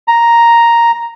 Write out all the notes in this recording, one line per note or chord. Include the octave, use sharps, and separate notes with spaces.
A#5